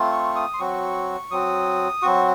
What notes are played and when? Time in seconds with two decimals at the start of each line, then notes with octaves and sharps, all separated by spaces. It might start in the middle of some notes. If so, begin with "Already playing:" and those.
Already playing: A3 C4 F4
0.12 C#6
0.36 D#6
0.54 C6
0.59 F#3 C4 F#4 C#6
1.31 F#3 C4 F#4 D#6
2.02 F#3 C4 F#4 C#6